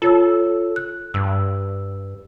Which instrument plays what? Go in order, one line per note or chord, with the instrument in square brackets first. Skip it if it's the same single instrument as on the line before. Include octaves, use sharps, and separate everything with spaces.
[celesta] F4 C#5 E6 [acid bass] A4
[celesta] F#6
[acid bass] G2 [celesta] E6